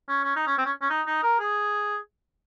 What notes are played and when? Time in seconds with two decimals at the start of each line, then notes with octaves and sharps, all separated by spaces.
0.09 C#4
0.24 C#4
0.36 D#4
0.47 C#4
0.58 C4
0.66 C#4
0.82 C#4
0.90 D#4
1.07 D#4
1.23 A#4
1.39 G#4